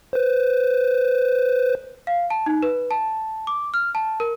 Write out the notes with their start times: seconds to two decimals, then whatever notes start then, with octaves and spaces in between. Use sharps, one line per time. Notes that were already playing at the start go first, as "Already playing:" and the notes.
0.13 B4 C5
2.07 F5
2.30 A5
2.46 D#4
2.63 B4
2.91 A5
3.47 D6
3.74 F6
3.95 A5
4.20 A#4